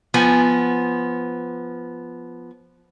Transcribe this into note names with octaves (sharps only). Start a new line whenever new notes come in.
F3 B3 G#5